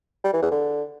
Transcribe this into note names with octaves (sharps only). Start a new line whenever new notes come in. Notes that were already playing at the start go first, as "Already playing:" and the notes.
G3
E3
E2
D3